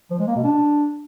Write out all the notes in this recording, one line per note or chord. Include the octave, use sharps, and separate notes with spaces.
F3
G#3
A#3
B2
D4